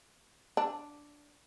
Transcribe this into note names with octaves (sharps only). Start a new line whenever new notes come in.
D4